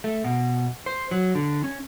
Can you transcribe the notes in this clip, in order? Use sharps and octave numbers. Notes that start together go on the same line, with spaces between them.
A3
B2
C5
F#3
D3
C#4